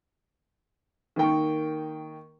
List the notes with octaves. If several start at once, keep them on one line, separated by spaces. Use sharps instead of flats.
D#3 A#3 G5 C#6